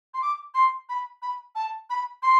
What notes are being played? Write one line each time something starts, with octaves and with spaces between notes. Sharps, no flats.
C6
D6
C6
B5
B5
A5
B5
C6